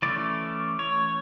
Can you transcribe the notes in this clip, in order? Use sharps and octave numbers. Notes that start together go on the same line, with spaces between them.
E3 A3 C#4 D5
C#5